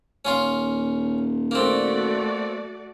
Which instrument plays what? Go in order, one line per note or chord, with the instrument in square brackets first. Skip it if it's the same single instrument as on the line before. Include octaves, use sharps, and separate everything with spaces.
[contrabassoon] D#1 [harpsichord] C#4 F4 F5
[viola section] A3 F#4 D5 [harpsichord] A#3 C4